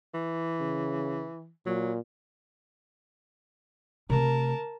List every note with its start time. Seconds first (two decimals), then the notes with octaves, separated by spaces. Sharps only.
0.14 E3
0.61 C#3
1.66 A#2 F#3
4.10 C3 A3 A#4 A5